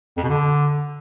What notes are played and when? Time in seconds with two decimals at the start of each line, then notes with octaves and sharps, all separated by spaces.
0.17 F2
0.23 B2
0.29 D3